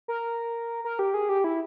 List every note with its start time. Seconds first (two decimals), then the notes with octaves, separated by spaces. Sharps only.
0.08 A#4
0.84 A#4
0.99 G4
1.14 G#4
1.29 G4
1.44 E4